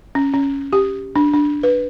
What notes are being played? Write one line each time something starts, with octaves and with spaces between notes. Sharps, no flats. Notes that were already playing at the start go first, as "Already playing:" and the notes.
C#4
C#4
G4
D4
D4
B4